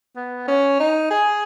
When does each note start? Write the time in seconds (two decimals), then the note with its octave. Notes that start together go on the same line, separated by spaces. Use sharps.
0.16 B3
0.48 C#4
0.80 D#4
1.11 G#4